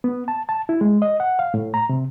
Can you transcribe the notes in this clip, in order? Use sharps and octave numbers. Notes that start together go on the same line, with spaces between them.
B3
A5
A5
E4
G#3
D#5
F#5
F5
A2
A#5
C3